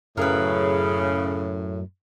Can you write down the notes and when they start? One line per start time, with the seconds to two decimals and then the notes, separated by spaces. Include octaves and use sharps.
0.17 F#2 A2 C#3 A#4 B4